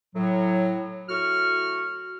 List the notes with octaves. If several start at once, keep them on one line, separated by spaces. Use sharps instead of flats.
A2 F#3
A2 F#4 C#6 F6